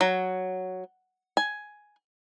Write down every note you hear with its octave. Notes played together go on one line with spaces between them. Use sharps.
F#3
G#5